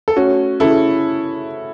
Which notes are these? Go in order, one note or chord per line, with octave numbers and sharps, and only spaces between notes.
A4
A3 C#4 F#4
C#3 E4 A4